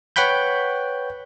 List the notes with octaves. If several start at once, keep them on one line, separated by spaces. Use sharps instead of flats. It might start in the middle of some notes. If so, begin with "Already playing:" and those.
B4 C#5 F#5 G5 B5 G6